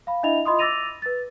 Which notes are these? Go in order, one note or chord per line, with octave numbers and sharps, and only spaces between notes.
F5 B5
D4 E4 D#5 E5 B5 F7
F4 D#5 B5 C6 D#6
D6 E6 A6 A#6 D#7 F7
B4 A6